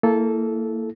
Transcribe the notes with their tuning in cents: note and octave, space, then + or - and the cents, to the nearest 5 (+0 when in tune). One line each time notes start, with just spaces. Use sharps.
A#3 -25 E4 +0 A4 -15